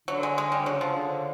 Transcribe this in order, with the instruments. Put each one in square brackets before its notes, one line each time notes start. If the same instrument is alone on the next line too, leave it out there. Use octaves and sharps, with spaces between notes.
[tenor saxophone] D3 [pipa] F#3
[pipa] G#3
G#3
G3
[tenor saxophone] C#3 [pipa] F#3
[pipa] F3
[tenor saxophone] D3